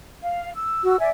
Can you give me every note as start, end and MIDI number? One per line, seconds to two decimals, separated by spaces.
0.23 0.51 77
0.55 0.98 88
0.84 0.99 66
1.00 1.09 74
1.00 1.11 76
1.00 1.09 80